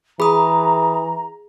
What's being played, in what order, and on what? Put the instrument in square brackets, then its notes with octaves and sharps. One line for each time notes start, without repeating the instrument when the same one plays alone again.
[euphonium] E3 [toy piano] G#4 [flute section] A#5 [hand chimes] B5 D#6